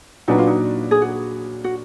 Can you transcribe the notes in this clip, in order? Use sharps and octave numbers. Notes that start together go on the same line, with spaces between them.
A#2 F#3 D4 D#4 F#4 B4
F4
D#4
G#4
F#4
F#4